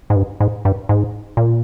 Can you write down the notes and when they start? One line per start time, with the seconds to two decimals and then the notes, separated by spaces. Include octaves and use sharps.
0.10 G#2
0.16 G2
0.40 G#2
0.65 G2
0.89 G#2
1.37 A#2